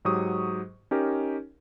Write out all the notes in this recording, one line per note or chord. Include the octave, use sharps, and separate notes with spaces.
G#2 F#3 G4 C#6 D#6
C#4 D#4 G4 A#4